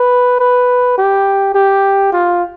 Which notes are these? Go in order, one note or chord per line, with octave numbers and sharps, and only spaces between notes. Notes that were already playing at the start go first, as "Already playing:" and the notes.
Already playing: B4
B4
G4
G4
F4